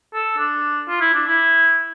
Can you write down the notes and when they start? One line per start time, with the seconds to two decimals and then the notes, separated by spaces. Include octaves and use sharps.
0.14 A4
0.38 D4
0.89 F4
1.01 E4
1.14 D4
1.27 E4